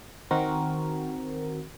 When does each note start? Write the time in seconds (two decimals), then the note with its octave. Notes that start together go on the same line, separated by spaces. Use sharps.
0.31 D#3 C4 F#4 A#4